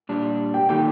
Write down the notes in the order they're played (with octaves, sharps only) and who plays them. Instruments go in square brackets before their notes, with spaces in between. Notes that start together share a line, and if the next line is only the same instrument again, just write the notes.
[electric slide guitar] A#2 G3 D4
[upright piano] G4 G5
[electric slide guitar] D#3 A#3 D#4 A4 [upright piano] G4 G5